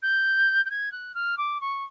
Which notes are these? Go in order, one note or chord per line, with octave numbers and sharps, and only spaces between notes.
G6
G6
G#6
F#6
F6
D6
C#6